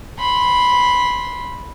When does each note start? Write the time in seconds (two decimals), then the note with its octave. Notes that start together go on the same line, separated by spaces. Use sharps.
0.19 B5 C6